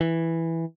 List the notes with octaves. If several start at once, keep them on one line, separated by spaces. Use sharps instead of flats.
E3